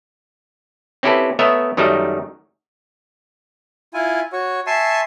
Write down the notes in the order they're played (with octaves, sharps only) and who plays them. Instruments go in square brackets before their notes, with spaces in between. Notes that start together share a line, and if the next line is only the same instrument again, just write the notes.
[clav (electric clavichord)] C4 C#4 E4 G4 A4 B4
A3 B3 A#4 C#5 D#5 E5
F#2 D#3 F#3 G3 A3 D#4
[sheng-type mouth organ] E4 F4 G#5
F#4 C#5
E5 G#5 A5 C6 C#6